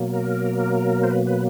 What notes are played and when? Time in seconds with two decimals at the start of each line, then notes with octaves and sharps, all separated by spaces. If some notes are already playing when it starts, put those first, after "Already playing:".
Already playing: B2 F#3 A#3
0.13 A#4
1.03 C5
1.11 B4
1.27 B4